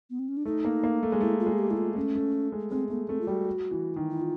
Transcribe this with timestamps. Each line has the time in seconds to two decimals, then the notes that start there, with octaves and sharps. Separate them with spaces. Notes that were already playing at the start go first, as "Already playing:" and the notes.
0.10 B3
0.19 C4
0.28 C#4
0.37 D4
0.45 A3 D#4
0.65 A#3
0.83 A#3
1.03 A3
1.12 G#3
1.21 A3 E4
1.40 F4
1.46 G#3
1.53 G#4
1.59 G4
1.71 A3 E4
1.77 F4
1.96 A3 C#4
2.15 A3
2.52 G#3
2.71 G#3 C4
2.90 A3 B3
3.09 A3 C4
3.21 F4
3.27 G3 F#4
3.71 E3
3.96 D#3
4.10 E4
4.22 F4